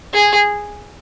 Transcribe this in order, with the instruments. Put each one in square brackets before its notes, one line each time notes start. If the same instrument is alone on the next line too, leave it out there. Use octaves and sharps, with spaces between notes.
[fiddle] G#4